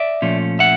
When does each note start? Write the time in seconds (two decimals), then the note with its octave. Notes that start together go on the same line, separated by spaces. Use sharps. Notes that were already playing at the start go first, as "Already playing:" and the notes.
Already playing: D5 E5
0.22 A#2 F3 A3 C#4
0.59 E5 F#5